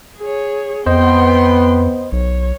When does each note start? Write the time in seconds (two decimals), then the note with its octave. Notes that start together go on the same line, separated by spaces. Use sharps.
0.19 G#4 C#5
0.86 F2 B3 C5 D#5 G5 C6
2.12 B1 C#5